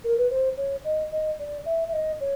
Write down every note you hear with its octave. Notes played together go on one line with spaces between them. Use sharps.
A#4
B4
C5
C#5
D#5
D#5
D5
E5
E5
D#5
C#5